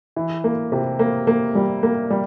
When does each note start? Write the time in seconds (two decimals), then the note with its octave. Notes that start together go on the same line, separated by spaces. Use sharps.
0.16 E3
0.44 A#3
0.72 C3
0.99 A#3
1.27 A#3
1.55 G3
1.83 A#3
2.10 G3